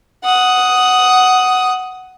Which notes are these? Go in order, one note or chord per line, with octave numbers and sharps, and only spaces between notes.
F#5 D#6